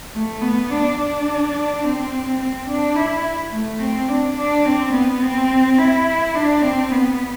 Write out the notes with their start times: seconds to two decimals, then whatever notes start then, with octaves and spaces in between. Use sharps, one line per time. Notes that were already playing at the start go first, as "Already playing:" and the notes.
0.13 A3
0.41 B3
0.70 D4
0.98 D4
1.83 C4
2.39 C4
2.68 D4
2.95 E4
3.52 A3
3.80 C4
4.09 D4
4.37 D4
4.65 C4
4.93 B3
5.22 C4
5.79 E4
6.35 D4
6.62 C4
6.91 B3